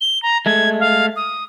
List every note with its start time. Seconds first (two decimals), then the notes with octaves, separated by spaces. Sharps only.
0.01 G7
0.23 A#5
0.46 G#3 A3 G#6
0.80 F5
1.16 D#6